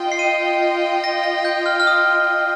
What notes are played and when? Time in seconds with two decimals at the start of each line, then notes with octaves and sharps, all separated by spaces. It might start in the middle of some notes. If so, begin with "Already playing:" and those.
Already playing: F4 D#5 G5
0.12 C7
0.19 D#7
1.04 A#6
1.24 A#6
1.38 A#6
1.45 G6
1.66 F6
1.80 F6
1.87 D#6